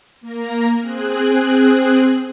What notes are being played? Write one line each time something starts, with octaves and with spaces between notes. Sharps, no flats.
A#3 A#4
C4 G#4 F#6